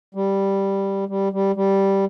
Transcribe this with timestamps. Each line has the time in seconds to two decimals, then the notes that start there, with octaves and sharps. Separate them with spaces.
0.15 G3
1.08 G3
1.32 G3
1.56 G3